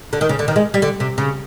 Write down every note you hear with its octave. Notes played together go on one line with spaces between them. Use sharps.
D3
D#3
C#3
D3
D#3
G#3
G3
D3
C3
C#3